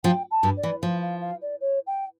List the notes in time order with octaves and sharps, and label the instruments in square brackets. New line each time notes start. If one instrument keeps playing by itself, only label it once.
[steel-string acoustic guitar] F3 F4 [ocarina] G5
[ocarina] A5
[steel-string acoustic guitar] G2 G3
[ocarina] D5
[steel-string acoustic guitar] E3
[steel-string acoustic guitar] F3 [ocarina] F5
[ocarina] F5
F5
D5
C#5
G5